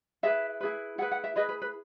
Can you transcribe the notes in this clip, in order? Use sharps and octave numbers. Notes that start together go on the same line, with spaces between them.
E4 G#4 B4 E5
E4 G#4 B4
E4 G#4 B4 F#5
F#5
E5
E4 G#4 B4 D#5
B4
B4